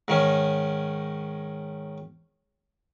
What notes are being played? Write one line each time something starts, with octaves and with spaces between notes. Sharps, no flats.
G#2 D#3 C#4